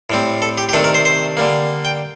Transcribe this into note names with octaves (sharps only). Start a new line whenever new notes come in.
A2 G3 C4
A4
G4
G4
C3 D#3 A3 D4 A4
A#4
C5
C5
D3 G3 A#3
G5